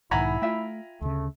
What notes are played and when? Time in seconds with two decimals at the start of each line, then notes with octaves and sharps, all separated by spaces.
0.11 B1 G#2 D#3 E4 F#5 G#5 A#5 B5
0.42 A3 F4 E5 G5
1.01 D2 C#3 A3